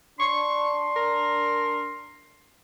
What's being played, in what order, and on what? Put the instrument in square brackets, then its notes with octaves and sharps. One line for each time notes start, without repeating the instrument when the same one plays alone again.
[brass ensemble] D4 [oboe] C6 [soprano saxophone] C#6
[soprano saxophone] A#4